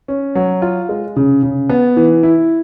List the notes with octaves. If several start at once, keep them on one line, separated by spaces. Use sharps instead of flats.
C#4
F#3
F4
G#3
C#3
C#3
B3
E3
E4